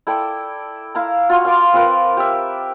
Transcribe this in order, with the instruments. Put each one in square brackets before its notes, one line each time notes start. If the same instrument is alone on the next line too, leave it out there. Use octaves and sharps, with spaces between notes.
[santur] E4 A4 D5 G5
E4 F5 A#5
F4 F#4
F5 G#5 C6 D6
C4 F4 A#4 B4
G4 E5